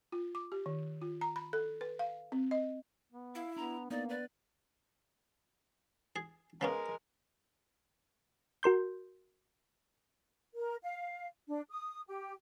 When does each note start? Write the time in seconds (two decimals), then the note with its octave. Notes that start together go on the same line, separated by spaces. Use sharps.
0.12 F4
0.35 D6
0.52 G4
0.66 D#3
1.02 F4
1.21 A#5
1.36 B5
1.53 A4
1.81 B4
1.99 F5
2.32 C4
2.51 D#5
3.13 B3
3.35 E4 F5
3.56 B3 D4 A#5
3.90 A#3 B3 D#4 D5
4.09 B4 D5
6.16 G#4
6.61 C#3 G#3 B3 C#4 A#4
8.63 F#4 A#4 C6 G6
10.54 A#4
10.84 F5
11.47 D4
11.70 D#6
12.08 G4